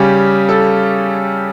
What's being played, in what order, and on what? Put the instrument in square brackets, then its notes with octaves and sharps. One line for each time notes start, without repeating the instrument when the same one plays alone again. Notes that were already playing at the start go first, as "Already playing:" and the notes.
Already playing: [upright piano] C#3 G3 C#4 G4
A4